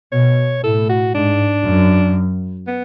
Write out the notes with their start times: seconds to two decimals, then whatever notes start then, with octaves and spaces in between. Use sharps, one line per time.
0.12 B2 C#5
0.63 A2 A4
0.89 F#4
1.14 G#2 D4
1.66 F#2
2.68 B3